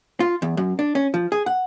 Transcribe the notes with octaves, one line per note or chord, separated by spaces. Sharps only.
F4
E2
F#2
D4
C#4
F3
G#4
F#5